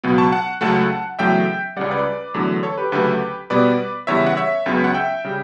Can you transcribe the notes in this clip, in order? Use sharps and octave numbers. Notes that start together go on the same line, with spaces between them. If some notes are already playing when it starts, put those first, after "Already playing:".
C#2 B2 F#3 B3
A5 C#6
F#5 A5
C#2 C#3 F#3 A3 F#5 A5
E2 C#3 F#3 A3 E5 G5
C#2 C#3 G3 D5 F#5
B4 D5
E2 D3 F#3 A3
A4 C#5
G4 B4
D2 C#3 F#3 A3 G4 B4
B2 G3 B3 B4 D5
E2 C#3 G3 C#5 E5
F#5
C#5 E5
C#2 C#3 F#3 B3
F#5
E5 G5
C#3 G3